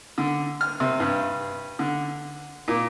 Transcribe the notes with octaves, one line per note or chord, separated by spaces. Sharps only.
D3
F6
C3
G2
D3
A#2